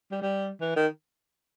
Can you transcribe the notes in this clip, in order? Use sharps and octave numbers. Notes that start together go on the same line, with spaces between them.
G3
G3
E3
D#3